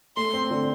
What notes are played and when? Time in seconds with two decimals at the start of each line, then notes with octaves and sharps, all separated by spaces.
0.17 A3 C6
0.33 C4
0.51 D3